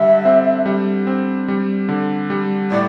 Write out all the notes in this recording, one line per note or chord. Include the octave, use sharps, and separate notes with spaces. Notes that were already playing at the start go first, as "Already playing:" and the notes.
Already playing: D3 G3 E5
C4
G3
C4
G3
D3
G3
A2 D5